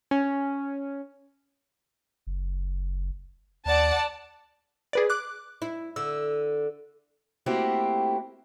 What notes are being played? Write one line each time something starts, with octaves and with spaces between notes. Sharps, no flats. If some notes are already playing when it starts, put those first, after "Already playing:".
C#4
F#1
D#2 D5 F#5 A5
G#4 B4 D5
D6 F#6
E4
D3 E6
A3 A#3 C4 E4 F#4 G4